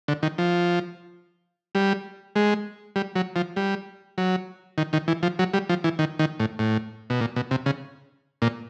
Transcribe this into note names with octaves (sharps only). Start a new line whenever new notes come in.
D3
D#3
F3
G3
G#3
G3
F#3
F3
G3
F#3
D#3
D#3
E3
F3
F#3
G3
F3
E3
D#3
D#3
A2
A2
B2
A#2
B2
C3
C#3
A#2